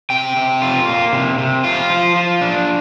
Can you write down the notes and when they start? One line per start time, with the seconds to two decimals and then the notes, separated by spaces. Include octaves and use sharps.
0.10 C3 G5
0.37 C3
0.62 F4
0.88 A#3
1.13 C3
1.38 C3
1.64 F3 F4
1.90 F3
2.16 F4
2.41 D4